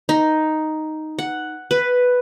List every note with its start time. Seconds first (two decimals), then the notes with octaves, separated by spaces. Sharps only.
0.09 D#4
1.19 F#5
1.71 B4